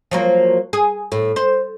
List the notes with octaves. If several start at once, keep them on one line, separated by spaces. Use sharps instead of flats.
F3 F#3 A#3
G#4
A2
C5